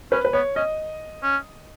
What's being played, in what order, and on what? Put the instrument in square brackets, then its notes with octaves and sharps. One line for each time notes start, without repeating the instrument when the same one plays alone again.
[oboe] C#4 [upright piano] B4
[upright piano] B4
[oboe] B3 [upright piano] C#5
[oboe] C#4 [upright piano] D#5
[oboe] C#4